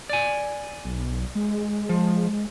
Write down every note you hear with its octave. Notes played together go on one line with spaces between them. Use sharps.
D5 G#5
B1
G#3
F3